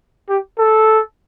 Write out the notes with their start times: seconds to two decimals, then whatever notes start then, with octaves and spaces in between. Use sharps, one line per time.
0.29 G4
0.58 A4